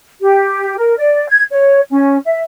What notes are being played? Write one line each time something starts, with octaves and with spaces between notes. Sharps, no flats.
G4
A#4
D5
G#6
C#5
C#4
E5